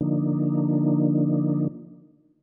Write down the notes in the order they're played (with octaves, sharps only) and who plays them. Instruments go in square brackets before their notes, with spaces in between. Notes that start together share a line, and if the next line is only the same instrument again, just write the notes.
[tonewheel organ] D3 F3 A#3 D4 D#4